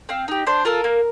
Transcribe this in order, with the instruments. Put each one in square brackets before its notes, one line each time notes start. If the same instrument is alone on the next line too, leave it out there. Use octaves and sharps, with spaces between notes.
[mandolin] C4 F5
D#4 G4
D4 C5
F4 A4 A#4
A#3